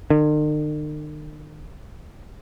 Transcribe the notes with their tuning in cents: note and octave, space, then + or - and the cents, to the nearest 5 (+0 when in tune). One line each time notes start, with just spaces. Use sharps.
D#3 -45